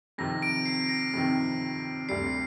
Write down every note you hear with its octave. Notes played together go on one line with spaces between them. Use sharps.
F2 C3 D#3 A#6
D7
C7
A#6
F2 C3 D#3
D2 C3 G3 C7